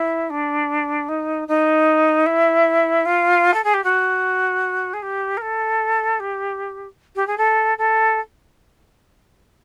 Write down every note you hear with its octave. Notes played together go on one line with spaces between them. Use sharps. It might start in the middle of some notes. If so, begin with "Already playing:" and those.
Already playing: E4
D4
D#4
D#4
E4
F4
A4
G#4
G4
F#4
G#4
G4
A#4
A4
G4
G4
G#4
A4
A4